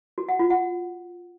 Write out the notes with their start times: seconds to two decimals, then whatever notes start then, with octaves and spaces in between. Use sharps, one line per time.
0.18 F#4
0.29 F#5
0.39 F4
0.50 F#5